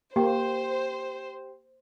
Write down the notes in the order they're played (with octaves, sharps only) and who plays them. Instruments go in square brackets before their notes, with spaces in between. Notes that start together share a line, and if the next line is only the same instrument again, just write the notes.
[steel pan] A#3 [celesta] G4 G5 [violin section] C5